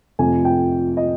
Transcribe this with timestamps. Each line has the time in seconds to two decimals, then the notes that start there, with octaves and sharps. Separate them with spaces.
0.19 F2 C3 F3 A3 G#5
0.45 G5
0.97 D#5